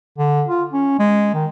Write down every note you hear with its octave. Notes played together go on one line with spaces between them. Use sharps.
D3
F4
C#4
G#3
D#3